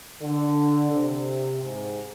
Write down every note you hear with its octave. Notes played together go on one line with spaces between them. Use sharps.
D3
C3
G#2